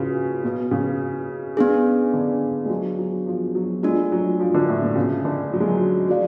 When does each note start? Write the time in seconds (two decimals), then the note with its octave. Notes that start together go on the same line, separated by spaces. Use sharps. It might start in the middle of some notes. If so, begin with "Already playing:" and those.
Already playing: C#3 F3 F#4 B4
0.44 B2
0.71 C#3
1.57 B3 D4 G#4
2.14 D3
2.65 G#3
2.69 F#3
2.99 F#3
3.27 F3
3.55 F#3
3.83 G#3 A3 D4 F4
4.12 F#3
4.39 F3
4.54 D3
4.68 A2
4.82 B2
4.96 C#3
5.25 D3
5.53 F#3
5.60 G#3
5.68 F#3
6.09 F#3 G#4 D5 F5